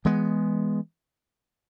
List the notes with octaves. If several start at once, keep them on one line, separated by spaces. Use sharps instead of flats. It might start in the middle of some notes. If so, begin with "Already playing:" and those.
E3 G#3 B3